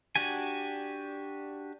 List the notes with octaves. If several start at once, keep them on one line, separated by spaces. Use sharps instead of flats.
D4 F#4 G4 G#5